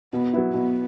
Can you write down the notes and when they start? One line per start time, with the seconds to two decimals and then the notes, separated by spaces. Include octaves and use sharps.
0.13 B2 B3
0.33 F#3 B3 E4
0.54 B2 B3